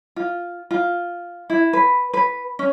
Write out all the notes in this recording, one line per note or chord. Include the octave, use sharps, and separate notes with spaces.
F4
F4
E4
B4
B4
C#4